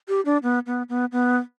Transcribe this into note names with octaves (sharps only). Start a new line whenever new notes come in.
G4
D4
B3
B3
B3
B3